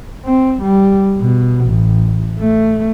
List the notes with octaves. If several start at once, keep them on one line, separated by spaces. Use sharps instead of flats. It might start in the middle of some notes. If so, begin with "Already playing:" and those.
C4
G3
B2
A1
A3